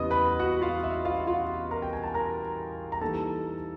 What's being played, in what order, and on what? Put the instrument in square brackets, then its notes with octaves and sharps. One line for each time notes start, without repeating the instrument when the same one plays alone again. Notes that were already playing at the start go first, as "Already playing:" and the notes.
Already playing: [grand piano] E2 C#3 E3 G3 B3 D#5 D#6
B4 B5
F#4 F#5
F4 F5
E5
F4 F5
F4 F5
A#4 A#5
G5
G#5
A5
A#4 A#5
A#5
E3 G3 A#3 D#4 A4 A5